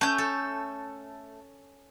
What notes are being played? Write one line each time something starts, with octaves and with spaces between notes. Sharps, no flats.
A3 C#4 G6
A4